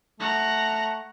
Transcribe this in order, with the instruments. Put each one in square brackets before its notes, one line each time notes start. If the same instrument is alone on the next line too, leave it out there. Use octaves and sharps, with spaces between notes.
[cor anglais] A3 [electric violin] F#5 A#5